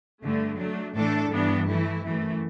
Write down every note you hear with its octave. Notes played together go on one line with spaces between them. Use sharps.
G2 D3 A3
F#3 A3 D4
A2 E3 A3 D4 A4
G2 E3 B3 D4
E3 A3 E4
F#2 E3 A3